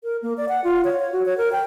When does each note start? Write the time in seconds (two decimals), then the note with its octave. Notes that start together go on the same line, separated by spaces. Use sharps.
0.04 A#4
0.22 A#3
0.37 D5
0.49 F#5
0.64 F4
0.84 C#5
1.00 C#5
1.12 F#4
1.25 C#5
1.38 A#4
1.52 G5